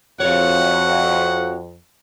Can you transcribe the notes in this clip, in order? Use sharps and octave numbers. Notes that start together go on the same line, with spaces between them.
F2 F#4 C#5 F5 F#5